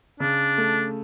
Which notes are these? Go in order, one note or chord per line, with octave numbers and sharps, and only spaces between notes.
C#3 D4
A3